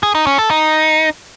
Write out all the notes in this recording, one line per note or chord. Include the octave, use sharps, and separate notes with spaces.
G#4
D#4
C#4
A4
D#4